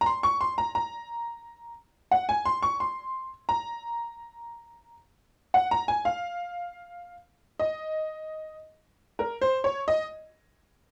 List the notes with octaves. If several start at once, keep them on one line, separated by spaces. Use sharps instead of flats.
A#5
C6
C#6
C6
A#5
A#5
F#5
G#5
C6
C#6
C6
A#5
F#5
A#5
G#5
F5
D#5
A#4
C5
C#5
D#5